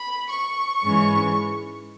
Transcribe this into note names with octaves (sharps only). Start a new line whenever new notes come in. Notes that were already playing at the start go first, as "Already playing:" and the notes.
Already playing: B5
C#6
G#2 E3 G#3 C#4